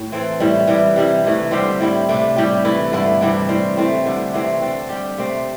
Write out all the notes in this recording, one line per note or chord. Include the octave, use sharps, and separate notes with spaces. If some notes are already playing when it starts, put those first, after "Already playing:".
Already playing: A2
E3 C4 A4
A2 G3 E4
E3 G3 D4 G4
C3 G3 E4
C3 E3 A3
D3 G3 C4 G4
A2 G3 E4
C3 A3 D4
A2 G3 E4 G4
E3 A3 E4 A4
G2 D3 A3 E4
C3 E3 G3 D4
A2 G3 C4
A2 A3 C4
D3 G3 D4
C3 E3 A3 C4
D3 C4 A4
G3 D4 G4
C3 A3 C4